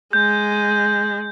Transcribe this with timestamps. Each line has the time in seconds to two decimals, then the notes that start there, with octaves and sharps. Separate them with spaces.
0.13 G#3 G6